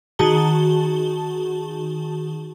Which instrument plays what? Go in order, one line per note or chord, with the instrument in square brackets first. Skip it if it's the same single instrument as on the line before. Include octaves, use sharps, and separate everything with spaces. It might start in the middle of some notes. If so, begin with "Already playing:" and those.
[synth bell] D#3 F#4 G#4 A5 G7